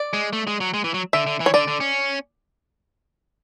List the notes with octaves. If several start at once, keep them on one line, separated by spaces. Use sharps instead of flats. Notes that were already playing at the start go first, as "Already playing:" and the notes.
Already playing: D5
G#3
A3
G#3
F#3
G#3
E3
F#3
D3 E5
D3
E3
C#5
D3 D5
D3
C#4